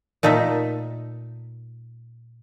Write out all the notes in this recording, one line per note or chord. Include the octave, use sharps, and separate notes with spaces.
A#2 A3 D#4 A4 E5